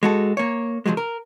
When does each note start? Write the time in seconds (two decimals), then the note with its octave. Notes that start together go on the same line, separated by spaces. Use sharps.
0.03 G#3 F#4 A4
0.37 A#3 C#5
0.86 C2 G#2 F3 F#3 G#3
0.97 A#4